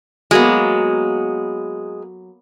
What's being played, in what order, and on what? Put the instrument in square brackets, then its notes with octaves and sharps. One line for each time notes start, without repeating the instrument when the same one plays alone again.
[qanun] F#3 A#3 B3 [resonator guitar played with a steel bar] G#3